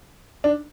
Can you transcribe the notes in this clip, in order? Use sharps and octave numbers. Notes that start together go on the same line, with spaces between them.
D4